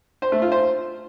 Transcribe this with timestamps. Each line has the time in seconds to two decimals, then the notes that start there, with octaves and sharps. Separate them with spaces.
0.22 C5
0.32 A3
0.42 F4
0.52 C5